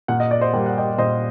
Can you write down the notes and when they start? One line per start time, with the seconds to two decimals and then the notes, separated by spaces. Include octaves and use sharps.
0.08 A#2 F#5
0.20 D#5
0.31 D5
0.41 C5 D#5
0.53 G3 A#3 G5
0.66 F#5
0.78 D#5 G5
0.98 A#2 C5 D#5